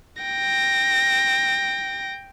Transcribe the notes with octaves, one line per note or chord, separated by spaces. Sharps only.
G5 A#6